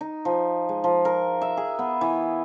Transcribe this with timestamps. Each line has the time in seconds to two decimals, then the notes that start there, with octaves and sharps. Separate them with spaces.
0.01 D#4
0.25 F3
0.69 G#3
0.84 F3
1.05 A#4
1.41 E5
1.57 G#4
1.79 B3
2.01 E3